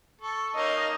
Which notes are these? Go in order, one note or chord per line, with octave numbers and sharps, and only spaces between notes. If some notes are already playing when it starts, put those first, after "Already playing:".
A4 C#6
A#3 C#4 D#4 D#5